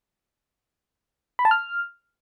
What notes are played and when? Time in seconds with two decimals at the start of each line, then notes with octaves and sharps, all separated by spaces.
1.39 B5
1.45 A5
1.51 F6